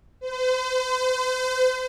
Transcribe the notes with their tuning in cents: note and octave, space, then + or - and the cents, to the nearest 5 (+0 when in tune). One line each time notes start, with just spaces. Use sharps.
C5 -40